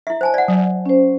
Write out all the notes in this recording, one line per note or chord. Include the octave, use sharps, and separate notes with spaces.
E4 E5
C5 G#5 A5
D5 F#5
F#3
C#4 C5